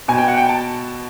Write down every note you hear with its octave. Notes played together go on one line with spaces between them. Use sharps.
B2 G#5
G5
F#5
G5
A5